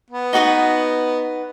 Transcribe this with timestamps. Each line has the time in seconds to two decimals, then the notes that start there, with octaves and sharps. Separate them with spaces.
0.11 B3
0.33 D#4 F#4 B4 D#5